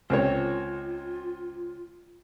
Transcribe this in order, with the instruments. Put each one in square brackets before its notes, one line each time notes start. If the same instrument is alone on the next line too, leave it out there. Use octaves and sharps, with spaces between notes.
[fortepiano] C#2 C4 C#5 [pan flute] F4